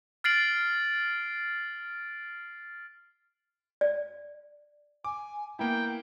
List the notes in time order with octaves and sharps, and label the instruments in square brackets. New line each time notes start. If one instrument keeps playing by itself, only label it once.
[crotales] F6 A6 C7 D7 F#7
[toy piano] D5
[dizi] G#5 [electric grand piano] D6
[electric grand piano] A#3 B3 E4 [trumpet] G5 [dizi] A#5